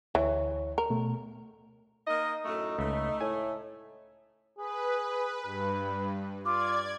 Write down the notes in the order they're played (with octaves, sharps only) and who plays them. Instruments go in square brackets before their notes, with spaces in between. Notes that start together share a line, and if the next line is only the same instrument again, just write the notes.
[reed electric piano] D2 C#5 [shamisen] E3
[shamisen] A#4
[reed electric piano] B2 A3
[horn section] A#3 A#4 D#5 [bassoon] D#4
[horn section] F#2 A2 A3
[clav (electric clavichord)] C#2 [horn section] A3
[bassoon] A2 [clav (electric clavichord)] G#5
[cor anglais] G#4 [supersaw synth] B4
[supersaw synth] G2 [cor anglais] B4
[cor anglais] F4 [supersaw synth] D5 G#6 [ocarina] D6